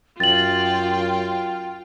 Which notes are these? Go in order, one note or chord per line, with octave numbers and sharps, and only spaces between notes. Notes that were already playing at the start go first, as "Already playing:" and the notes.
F#2 F4 G5 A6 F#7